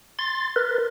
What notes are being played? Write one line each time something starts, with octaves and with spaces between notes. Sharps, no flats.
C6 A6
A#4 B4